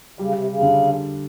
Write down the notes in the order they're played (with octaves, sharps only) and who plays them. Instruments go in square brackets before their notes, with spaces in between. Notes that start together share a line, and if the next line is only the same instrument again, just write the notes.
[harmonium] C#3 [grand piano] G3
[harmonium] C3
C#3
[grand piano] D3